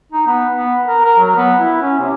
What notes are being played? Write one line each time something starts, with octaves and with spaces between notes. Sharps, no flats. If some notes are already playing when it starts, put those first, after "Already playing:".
D#4
B3
B3
A#4
A#4
F#3
B3
E4
C#4
C3